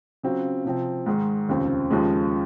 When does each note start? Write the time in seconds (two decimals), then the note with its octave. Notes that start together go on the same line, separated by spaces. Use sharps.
0.23 C#3 F#3 C4 F4
0.65 C3 F3 C4
1.06 G#2 D#3 G#3
1.48 F1 D#2 C#3 F3 C4
1.91 D#2 C#3 F3 G#3